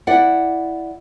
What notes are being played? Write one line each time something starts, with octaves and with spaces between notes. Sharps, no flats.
E4 D5 F#5